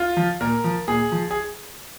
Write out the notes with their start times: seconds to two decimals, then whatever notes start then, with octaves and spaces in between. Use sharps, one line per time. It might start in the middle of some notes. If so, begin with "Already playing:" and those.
Already playing: F4
0.17 F3
0.41 A#2 A#4
0.64 F3
0.88 A#2 G#4
1.12 F3
1.31 G#4